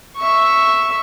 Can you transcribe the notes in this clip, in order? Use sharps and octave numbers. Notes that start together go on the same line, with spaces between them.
E5 C#6